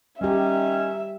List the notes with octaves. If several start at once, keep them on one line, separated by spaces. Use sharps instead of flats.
D#3 G3 C#4 G4 E5